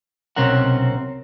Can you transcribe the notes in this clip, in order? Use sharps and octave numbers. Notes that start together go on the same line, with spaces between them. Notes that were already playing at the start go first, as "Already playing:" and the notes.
B1 C3 C4 C#4 A#4 F#5